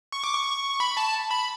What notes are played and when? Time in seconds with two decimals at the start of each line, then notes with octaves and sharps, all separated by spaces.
0.12 C#6
0.24 D6
0.35 C#6
0.80 B5
0.97 A5
1.31 B5